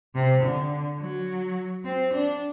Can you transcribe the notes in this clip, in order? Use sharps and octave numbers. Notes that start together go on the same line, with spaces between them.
C3
D3
F#3
C4
D4